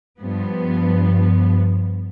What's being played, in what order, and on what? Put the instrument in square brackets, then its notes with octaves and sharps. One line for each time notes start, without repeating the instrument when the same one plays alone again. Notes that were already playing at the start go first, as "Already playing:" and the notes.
[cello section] G2 F3 B3